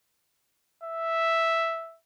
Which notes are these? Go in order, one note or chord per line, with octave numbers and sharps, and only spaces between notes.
E5